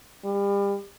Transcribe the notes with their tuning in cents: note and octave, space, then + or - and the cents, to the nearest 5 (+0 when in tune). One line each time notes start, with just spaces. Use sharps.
G3 +35